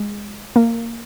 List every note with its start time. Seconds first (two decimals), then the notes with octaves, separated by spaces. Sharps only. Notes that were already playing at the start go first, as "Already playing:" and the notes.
Already playing: G#3
0.56 A#3